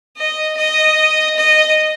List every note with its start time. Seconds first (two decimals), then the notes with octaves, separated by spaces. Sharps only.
0.17 D#5
0.57 D#5
1.36 D#5